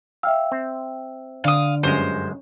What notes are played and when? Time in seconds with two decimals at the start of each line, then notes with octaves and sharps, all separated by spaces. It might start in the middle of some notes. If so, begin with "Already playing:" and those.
0.23 E5 F5 G5 E6
0.52 C4
1.44 D3 F5 D#6 D7
1.83 G1 F#2 G#3 C#4 C5